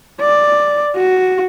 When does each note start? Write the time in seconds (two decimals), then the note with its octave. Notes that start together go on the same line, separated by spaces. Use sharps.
0.21 D5
0.96 F#4